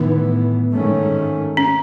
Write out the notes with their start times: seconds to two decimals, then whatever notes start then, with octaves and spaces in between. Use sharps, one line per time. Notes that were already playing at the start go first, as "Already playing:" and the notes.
Already playing: A2 D#3 E3 B3 D#4
0.72 G#2 D#3 A3 C#4
1.57 C#4